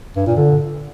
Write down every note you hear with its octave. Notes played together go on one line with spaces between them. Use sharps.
G2
A#2
D3